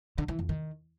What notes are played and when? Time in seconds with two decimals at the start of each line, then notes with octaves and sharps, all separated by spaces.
0.18 D3
0.28 E3
0.39 F2
0.49 D#3